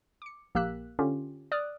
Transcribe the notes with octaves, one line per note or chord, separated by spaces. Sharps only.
D6 C#7
A#1 A#3 G4 E6 F#6 B6
D3 C#4 F4 G4
D5 D6 D#6 F6 F#6